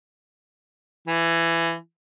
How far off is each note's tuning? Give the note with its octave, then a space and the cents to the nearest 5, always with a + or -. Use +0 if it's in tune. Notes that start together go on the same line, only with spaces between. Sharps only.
E3 +20